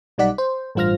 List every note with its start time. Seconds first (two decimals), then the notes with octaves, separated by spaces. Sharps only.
0.18 B1 G3 D#4 D5 F#5 B6
0.38 C5
0.75 A1 G2 F4 C5 F6 A#6